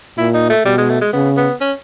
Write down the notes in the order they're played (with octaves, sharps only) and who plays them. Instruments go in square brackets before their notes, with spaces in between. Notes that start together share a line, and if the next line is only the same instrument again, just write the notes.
[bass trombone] A#2 [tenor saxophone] E4
[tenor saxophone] D#4
A3
[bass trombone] B2 [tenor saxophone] G3
[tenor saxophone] G#3
A3
G#3
[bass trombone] C#3 [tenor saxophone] B3
[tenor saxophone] B3
C#4